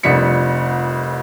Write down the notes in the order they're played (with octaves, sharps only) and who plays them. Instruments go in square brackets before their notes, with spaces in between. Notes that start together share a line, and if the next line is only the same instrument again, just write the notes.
[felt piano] F1 C2 F2 D4 B6 C#7